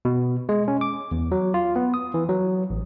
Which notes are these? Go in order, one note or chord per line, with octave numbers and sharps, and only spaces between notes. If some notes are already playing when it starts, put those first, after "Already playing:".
B2
G#3
C#4
D6
E2
F#3
F4
B3
D#6
E3
F#3
A1